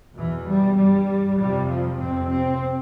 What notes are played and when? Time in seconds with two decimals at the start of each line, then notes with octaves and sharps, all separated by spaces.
0.15 E2 B2 E3
0.45 G3
0.76 G2 G3
1.37 F2 C3 G3
1.68 F3
1.98 F2 C3 C4
2.28 C4